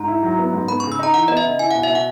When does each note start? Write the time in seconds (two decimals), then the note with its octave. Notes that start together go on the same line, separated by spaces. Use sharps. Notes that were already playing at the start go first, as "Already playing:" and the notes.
Already playing: G#2 A#5
0.08 E4
0.23 F#3
0.39 B3
0.53 G#2
0.68 B3 B5
0.80 C#3 C#6
0.92 E6
0.99 D#4 A#5
1.14 E3 F#5
1.28 B3 D#5
1.37 E5
1.44 C#3
1.59 E4 G#5
1.71 B2 F#5
1.83 E5
1.90 B2
1.95 F#5